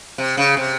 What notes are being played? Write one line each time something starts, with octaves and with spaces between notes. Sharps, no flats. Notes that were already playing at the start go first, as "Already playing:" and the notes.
C3
C#3
C3